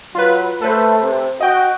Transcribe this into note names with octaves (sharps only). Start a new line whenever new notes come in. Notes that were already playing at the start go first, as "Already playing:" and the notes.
F#3 F4 B4
A3 A4 B4 C5
C3
F#4 D#5 G5